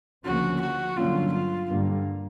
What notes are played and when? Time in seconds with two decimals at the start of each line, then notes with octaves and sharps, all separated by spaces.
0.25 D2 C#3 F3 A#3 C#4 F#4
0.61 F#4
0.97 G2 D3 F#3 A#3 C#4 F4
1.32 F4
1.68 G2 D3 G3 A#3